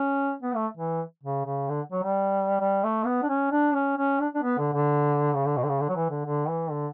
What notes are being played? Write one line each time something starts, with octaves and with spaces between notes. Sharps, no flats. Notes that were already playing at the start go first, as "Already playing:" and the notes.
Already playing: C#4
B3
A3
E3
C#3
C#3
D3
F#3
G3
G3
A3
B3
D4
C#4
D4
C#4
C#4
D4
D4
B3
D3
D3
C#3
D3
B2
D3
C#3
D3
F#3
E3
D3
D3
E3
D3